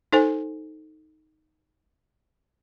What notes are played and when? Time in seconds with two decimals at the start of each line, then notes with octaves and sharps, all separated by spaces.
0.12 D#4 A4 C5 G#5